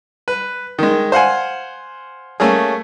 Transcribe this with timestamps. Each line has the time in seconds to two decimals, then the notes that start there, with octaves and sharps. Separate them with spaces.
0.28 B4
0.79 D#3 G#3
1.12 C5 F5 F#5 G#5
2.40 A3 A#3 C#4 G#4